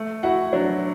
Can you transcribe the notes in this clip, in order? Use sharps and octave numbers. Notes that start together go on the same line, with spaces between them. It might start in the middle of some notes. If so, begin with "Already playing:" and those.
Already playing: A3
E4 F#4 F#5
F#3 D4 D5